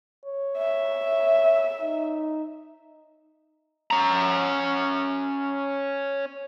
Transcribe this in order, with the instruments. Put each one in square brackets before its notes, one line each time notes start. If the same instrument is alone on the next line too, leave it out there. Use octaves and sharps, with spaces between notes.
[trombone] C#5
[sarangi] E5
[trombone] D#4
[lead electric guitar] C#4 A#5